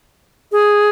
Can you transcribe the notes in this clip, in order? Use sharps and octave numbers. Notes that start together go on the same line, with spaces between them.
G#4